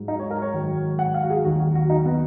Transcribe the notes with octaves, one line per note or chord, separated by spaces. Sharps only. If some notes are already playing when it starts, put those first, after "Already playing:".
Already playing: G#2 F#3
D#4
C#5
A#4
C#5
G#2 D#3 F#3
F#5
F5
F#4
G#4
D#2 D#3 F#3 F#4
F#4
F#4
D#4
B3